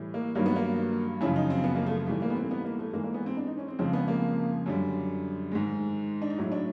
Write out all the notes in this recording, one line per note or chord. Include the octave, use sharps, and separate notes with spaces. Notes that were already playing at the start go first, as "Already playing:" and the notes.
Already playing: A2 E3 G3
A#3
G2 D#3 F#3 A#3
B3
A#3
F#2 C#3 F3 E4
D#4
C4
B3
A#3
A3
G#2 E3 G3 A3
A#3
B3
C4
B3
A#3
A3
G#2 E3 G#3 A#3
A#3
B3
C4
D4
D#4
C#4
C4
F2 C#3 F3 G#3 C4
B3
A#3
F#2 D3 G3
G#2 D#3 G#3
D4
D#4
A2 F#3 E4
D4